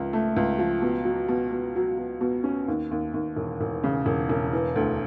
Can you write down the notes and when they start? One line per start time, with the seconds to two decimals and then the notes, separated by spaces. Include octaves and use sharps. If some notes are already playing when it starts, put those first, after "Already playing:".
Already playing: C#2 F3
0.13 A3
0.36 C#2
0.59 F3
0.82 B2
1.05 F#3
1.28 B2
1.52 B2
1.76 F#3
1.98 B2
2.21 B2
2.44 C#4
2.68 D#2
2.91 D#2
3.14 D#2
3.36 E1
3.61 E1
3.84 C#3
4.06 E1
4.29 E1
4.53 E3
4.76 D2